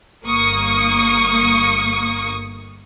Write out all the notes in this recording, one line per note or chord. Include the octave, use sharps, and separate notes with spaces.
G1 A#3 C#6 D#6